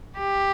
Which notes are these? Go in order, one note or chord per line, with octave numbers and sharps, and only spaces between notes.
G4